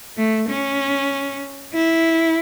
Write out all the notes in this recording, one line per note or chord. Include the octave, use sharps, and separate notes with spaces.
A3
C#4
E4